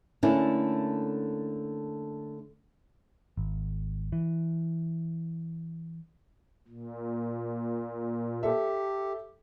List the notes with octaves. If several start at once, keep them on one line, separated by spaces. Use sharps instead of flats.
D3 A3 A#3 C#4 D4 E4
G#1
E3
A#2
G4 A4 E5